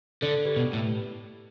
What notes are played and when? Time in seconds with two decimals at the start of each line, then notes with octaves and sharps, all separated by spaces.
0.22 D3 A4 D5
0.45 G4 B4
0.56 B2
0.73 A2